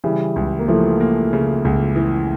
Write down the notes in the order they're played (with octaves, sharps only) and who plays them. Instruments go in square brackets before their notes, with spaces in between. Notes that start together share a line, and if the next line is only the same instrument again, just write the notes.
[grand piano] C#3 [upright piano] E3 G3
[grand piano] C#2
[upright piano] A#3
[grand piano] E3 [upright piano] F3 A3
[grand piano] A#3
C#3
C#2
E3